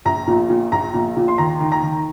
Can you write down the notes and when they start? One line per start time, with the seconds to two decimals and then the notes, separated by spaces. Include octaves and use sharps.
0.05 A#1 A#5
0.28 A#2
0.50 A#2
0.72 A#1 A#5
0.94 A#2
1.17 A#2
1.28 C6
1.38 D#2 A#5
1.60 D#3
1.72 A#5
1.83 D#3